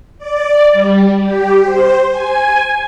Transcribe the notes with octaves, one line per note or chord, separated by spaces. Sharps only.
D5
G3
G4
C5
G#5